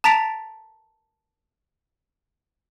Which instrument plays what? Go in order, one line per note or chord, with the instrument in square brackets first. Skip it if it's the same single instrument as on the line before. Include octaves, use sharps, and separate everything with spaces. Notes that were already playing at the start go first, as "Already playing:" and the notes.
[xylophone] A5 A#5 A6 B6 D7 F7